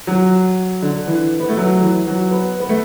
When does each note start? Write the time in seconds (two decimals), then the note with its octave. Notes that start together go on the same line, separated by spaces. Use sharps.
0.07 F#3
0.82 D3
1.07 E3
1.40 B3
1.49 A3
1.57 F#3
1.81 E3
2.07 F#3
2.31 B3
2.60 B3
2.69 A3